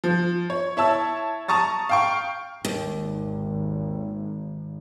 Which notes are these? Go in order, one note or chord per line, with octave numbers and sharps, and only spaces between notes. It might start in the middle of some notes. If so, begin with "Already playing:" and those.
F3
C#5
E4 C#5 A5 E6
A5 A#5 C#6 D#6 A6
F5 G5 C#6
G#1 D#2